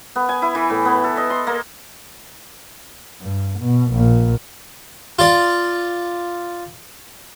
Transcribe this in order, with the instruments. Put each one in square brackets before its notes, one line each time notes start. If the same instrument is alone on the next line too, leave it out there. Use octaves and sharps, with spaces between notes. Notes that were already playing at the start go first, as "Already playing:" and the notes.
[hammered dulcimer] B3
G#5
E4
E3
A2
B3
A4
D#5
C6
A#3
[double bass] G2
B2
A#1 A#2
[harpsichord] F4 D5